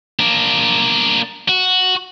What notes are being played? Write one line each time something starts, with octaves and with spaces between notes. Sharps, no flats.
A#3 D4
F#4